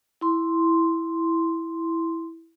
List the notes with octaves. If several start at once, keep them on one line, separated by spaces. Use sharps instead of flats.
E4 C6